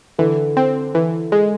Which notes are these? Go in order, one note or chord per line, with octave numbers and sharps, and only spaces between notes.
D3 E3
C4
E3
G#3